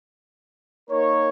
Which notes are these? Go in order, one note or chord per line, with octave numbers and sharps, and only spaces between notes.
A#3 D#4 A#4 C#5